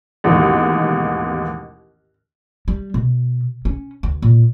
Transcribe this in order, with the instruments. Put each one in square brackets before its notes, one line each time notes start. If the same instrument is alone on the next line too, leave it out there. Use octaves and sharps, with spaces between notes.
[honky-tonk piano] A1 D#2 G#2 B2
[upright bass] G3
B2
C#4
D2
A#2